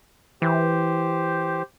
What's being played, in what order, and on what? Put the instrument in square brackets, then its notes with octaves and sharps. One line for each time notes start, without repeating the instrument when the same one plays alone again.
[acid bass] E3 [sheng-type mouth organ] G4 C5